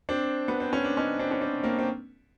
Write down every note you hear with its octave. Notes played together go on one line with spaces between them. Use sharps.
C4 D4
B3
C4
C#4
D4
C#4 D#4
C4 D4
C#4
C4 D4
A#3 C4
C4